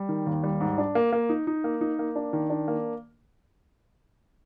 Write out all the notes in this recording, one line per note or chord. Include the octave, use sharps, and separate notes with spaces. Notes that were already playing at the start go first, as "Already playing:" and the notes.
Already playing: G3
D#3
D#2
G3
G#2
D4
A#3
A#3
D#4
D#4
A#3
D#4
A#3
D4
D#3
D4
A#3